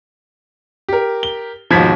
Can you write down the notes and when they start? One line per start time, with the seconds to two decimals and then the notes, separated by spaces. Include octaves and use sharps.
0.89 G4 A#4
1.23 G7
1.70 D#2 G#2 B2 F3 G#6 B6